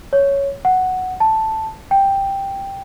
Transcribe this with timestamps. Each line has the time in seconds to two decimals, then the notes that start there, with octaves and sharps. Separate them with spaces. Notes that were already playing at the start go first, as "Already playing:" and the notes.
0.13 C#5
0.65 F#5
1.20 A5
1.91 G5